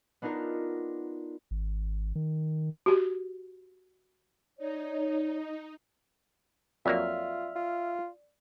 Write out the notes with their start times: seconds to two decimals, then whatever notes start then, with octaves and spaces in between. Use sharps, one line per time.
0.22 B3 D4 D#4 F4 A#4
1.51 G#1
2.15 D#3
2.86 F#4 G4
4.58 D#4 C#5 D5
6.86 F2 F#3 A#3 F4 D5 E5 F6
7.56 F4